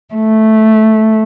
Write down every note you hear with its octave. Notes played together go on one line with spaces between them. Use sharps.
A3